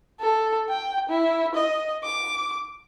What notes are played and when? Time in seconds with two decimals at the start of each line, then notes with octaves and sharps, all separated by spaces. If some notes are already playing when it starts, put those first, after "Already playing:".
0.20 A4
0.70 G5
1.09 E4
1.55 D#5
2.04 D6